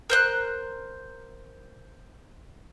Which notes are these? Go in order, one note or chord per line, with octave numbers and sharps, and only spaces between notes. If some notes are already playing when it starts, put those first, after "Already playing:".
A#4 C5 F#6